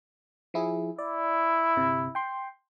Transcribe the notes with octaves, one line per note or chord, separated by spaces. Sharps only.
F3 E4 G#4
E4 D5
G1 C3
G5 C6